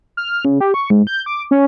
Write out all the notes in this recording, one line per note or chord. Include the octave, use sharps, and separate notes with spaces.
F6
C#3
G4
C#6
G#2
G6
D6
C#4